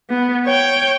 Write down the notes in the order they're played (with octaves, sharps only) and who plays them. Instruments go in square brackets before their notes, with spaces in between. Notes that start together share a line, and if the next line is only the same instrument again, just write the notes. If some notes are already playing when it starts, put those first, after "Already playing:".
[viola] B3
C#5 G5